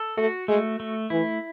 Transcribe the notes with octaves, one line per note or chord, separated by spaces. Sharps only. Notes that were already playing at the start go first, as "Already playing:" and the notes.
Already playing: A4
A3 F#4
G#3 A3
A3
E3 E4